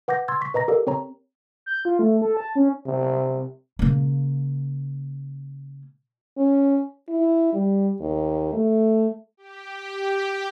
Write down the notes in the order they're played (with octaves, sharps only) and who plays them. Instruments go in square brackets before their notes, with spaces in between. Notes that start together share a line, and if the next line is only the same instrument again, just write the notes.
[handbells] B4 F#5 D6 G6 A#6
C6 E6 G#6 A6
C#6 B6
B4 D#5 A#5 A#6
G4 A4 A#4 D5 D#5 F5
C4 C#5 A#5
[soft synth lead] G6
F4
A3
A4
A5
C#4
[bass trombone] C3
[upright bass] C#3 A#3
[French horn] C#4
E4
G3
D#2
A3
[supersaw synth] G4